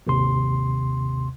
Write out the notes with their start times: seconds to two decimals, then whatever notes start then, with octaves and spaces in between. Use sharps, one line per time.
0.07 G#1 D#2 C3 C6